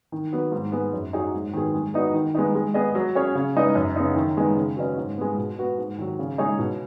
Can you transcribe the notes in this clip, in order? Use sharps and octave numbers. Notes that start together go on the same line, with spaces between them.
D#3
F#3 B3
G#2
G#3 B3
F#2
F#3 D#4 G#4
G#2
D#3 F#3 B3 G#4
G#3
B3 D#4 F#4 D#5
D#3
G#3 B3 D#4
G#3
B3 G#4 D#5
F#3
C#4 G#4 C#5
C#3
G#3 D#4 B4 D#5
F#2
C#3 B3 D#4
D#3
G#3 B3 D#4
C#3
F#3 C#4 B4 D#5
G#2
G#3 B3
B2
B3 F#4 B4
G#2
D#3 F#3
C#3
G#3 D#4 G#4 C#5
B2